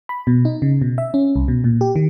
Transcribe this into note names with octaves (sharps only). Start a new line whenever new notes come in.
B5
B2
D#4
C#3
B2
E5
C#4
C2
B2
A#2
G4
D#3